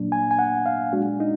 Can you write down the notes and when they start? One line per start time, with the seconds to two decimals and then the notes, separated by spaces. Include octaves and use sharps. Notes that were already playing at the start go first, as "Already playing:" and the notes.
Already playing: A#2 F#3 A#3 D4
0.12 G#5
0.31 G#5
0.39 F#5
0.66 F5
0.93 A#2 G#3 D4 F#4
1.20 D#4